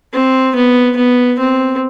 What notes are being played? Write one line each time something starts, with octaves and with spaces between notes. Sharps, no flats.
C4
B3
B3
C4